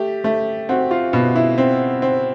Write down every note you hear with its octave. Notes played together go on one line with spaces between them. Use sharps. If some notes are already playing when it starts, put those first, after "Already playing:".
Already playing: A3 G4
A3
C4 F#4
F4
B2
E4
C4
C4